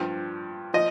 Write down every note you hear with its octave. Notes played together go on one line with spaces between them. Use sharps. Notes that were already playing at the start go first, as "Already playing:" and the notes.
Already playing: G2 F3
F3 D#5